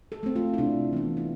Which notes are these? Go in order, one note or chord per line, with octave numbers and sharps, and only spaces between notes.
A4
A3 C4
F4
E4
C3 D4
E3 B3 D4
E4